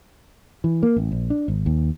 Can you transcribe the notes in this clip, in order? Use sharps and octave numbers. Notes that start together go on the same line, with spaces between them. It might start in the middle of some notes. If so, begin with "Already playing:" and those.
E3
A#3
A1
A#1
D4
G#1
D#2